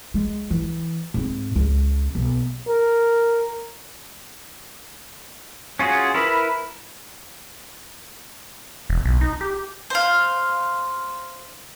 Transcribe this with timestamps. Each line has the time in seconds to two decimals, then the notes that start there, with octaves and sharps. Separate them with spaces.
0.14 G#3
0.51 E3
1.14 G#2 C4
1.56 C#2
2.15 B1
2.68 A#4
5.79 C#4 F4 F#4 G#4
6.14 E4 A#4 B4 B5
8.90 E1
9.05 B1
9.21 D#4
9.41 G4
9.90 C5 F5